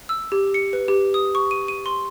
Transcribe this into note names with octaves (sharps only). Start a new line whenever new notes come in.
E6
G4
C#7
B4
G4
D#6
C#6
D#7
D#7
C6